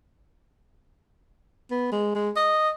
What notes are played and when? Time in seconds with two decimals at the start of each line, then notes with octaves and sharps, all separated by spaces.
1.71 B3
1.92 G#3
2.15 G#3
2.36 D#5